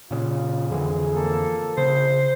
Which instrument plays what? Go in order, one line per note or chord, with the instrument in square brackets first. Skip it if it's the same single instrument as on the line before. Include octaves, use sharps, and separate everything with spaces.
[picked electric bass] A#2 C#3 [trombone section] F4
[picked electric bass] F2 D3 E3 [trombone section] G#4
[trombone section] F3 A#3 A4
[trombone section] A#1 [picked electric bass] C#3 [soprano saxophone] C5